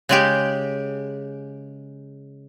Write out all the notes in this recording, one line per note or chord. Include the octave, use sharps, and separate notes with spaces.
C#3 G#3 G4